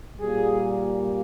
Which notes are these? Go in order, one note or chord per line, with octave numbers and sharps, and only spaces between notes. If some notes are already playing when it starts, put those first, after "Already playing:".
A#2 G3 A#3 G#4